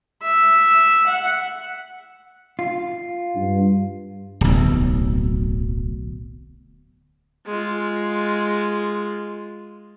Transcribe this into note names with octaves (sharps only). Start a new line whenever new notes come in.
E5
F#5
F4
G2
D1 B1
G#3 F4